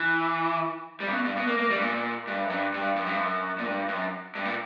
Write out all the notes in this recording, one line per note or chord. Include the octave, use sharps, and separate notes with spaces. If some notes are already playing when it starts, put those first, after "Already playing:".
Already playing: E3
G3
C#3
B2
G2
B2
A#3
A#3
G3
G2
A#2
G2
F#2
G2
G2
F#2
G2
F#2
A#2
G2
F#2
G2
A#2